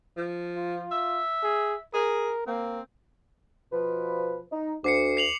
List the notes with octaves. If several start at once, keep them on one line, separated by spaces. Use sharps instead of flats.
F3
F4
E5
G#4
G#4 A#4
A#3 C4
B2 F3 B4
D#4
D2 D6 C7 C#7
C7 F7 F#7